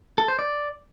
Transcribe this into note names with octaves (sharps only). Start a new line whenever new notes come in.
A4
C5
D5